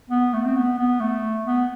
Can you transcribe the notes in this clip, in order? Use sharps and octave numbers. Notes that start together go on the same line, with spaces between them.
B3
A3
C4
B3
B3
A3
B3